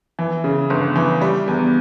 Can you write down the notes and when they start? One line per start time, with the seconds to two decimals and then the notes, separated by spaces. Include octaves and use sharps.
0.19 E3
0.44 C#3
0.70 G1
0.96 E3
1.22 G3
1.48 E2